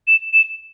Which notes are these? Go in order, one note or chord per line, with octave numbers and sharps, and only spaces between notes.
E7
E7